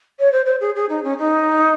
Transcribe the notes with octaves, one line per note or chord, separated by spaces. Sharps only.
C#5
C5
C5
G#4
G#4
D#4
C#4
D#4